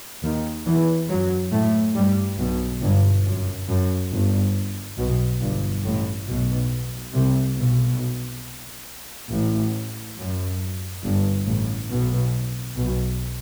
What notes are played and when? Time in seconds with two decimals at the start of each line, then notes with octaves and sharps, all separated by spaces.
0.23 D#2 D#3
0.65 E2 E3
1.09 F#2 F#3
1.52 A2 A3
1.95 G2 G3
2.38 B1 B2
2.81 G1 G2
3.26 F#2
3.68 F#2
4.11 G1 G2
4.98 B1 B2
5.41 G1 G2
5.84 A1 A2
6.27 B1 B2
7.14 C2 C3
7.57 B1 B2
9.30 A1 A2
10.17 F#2
11.03 G1 G2
11.46 A1 A2
11.89 B1 B2
12.76 B1 B2